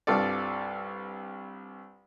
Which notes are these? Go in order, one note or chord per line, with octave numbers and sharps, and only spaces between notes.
C2 G2 F4 A4 D5